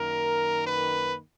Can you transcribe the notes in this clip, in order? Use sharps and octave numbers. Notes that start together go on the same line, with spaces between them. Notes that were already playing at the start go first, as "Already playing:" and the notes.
Already playing: F#2 D#3 A#3 A#4
B4